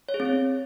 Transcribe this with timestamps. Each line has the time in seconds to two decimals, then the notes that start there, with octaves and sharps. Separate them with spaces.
0.09 C#5
0.14 G#4
0.20 C4
0.25 C#5